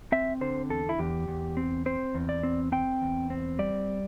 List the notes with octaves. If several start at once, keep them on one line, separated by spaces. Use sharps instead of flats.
C4 E5
D3 C5
E2 A4
E4
E2 G4
E2
C4
C4 C5
E2
D5
C4
C4 G5
E2
C4
G3 D5